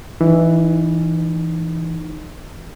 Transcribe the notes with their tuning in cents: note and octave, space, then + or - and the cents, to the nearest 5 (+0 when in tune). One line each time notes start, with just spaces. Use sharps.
E3 +0 D#4 -25